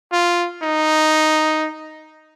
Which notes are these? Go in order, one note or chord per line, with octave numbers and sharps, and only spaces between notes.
F4
D#4